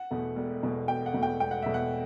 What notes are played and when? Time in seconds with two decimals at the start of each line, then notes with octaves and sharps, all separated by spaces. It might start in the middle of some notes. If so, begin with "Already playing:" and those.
Already playing: F#5
0.11 E2 B2 A3
0.36 E1
0.63 E2 B2 A3
0.88 E1 G5
1.06 F#5
1.14 E2 B2 A3
1.23 G5
1.40 E1 G5
1.51 F#5
1.62 E2 B2 A3 E5
1.74 F#5